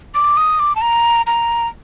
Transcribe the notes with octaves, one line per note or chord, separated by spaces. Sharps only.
D6
D#6
D6
A5
A#5
A#5